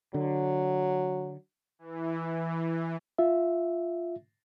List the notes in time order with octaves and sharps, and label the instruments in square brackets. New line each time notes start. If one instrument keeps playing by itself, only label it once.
[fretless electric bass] D3 [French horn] F#3
[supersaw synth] E3
[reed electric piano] F4 E5